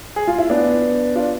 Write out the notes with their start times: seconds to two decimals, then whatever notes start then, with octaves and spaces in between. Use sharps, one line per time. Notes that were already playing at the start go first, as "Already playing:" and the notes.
0.16 G#4
0.28 F4
0.38 E4
0.50 B3 D4
1.15 D4 F4